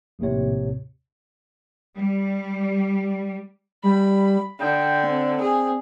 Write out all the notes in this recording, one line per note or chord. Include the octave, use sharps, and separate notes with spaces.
A#1 D#2 A2 C3 C#5
G3
G3 B5
D3 G5
C4
G#4